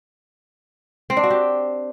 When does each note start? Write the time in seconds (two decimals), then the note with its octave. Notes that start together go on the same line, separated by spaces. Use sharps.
1.10 C4
1.17 D4
1.24 F#4
1.30 G4